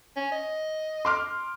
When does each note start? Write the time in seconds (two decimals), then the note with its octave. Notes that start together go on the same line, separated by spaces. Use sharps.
0.16 C#4
0.32 D#5
1.05 C6 D6 F6